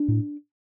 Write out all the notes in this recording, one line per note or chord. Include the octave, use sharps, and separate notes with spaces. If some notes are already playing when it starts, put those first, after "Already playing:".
Already playing: D4
A2